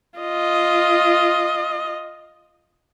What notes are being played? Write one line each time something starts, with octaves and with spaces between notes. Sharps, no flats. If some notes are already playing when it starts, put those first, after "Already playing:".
F4 D#5